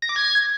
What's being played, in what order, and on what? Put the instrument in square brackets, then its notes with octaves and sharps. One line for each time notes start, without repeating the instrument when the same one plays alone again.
[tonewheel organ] A#6
D6
G#6